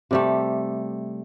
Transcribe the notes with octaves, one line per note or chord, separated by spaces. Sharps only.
C3 G3 A3